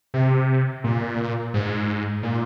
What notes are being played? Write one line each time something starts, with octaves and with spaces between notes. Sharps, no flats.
C3
A#2
G#2
A#2